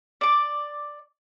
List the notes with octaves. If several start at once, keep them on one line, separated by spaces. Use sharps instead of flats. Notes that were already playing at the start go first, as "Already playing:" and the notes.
D5 D6